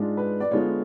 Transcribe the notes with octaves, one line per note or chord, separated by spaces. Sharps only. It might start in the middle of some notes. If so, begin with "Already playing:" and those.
Already playing: G#2 G#3 D4 F4
B4
D5
D3 G#3 B3 F4 C#5